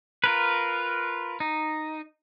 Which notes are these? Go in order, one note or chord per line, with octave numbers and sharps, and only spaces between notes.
F4 A#4 B4
D#4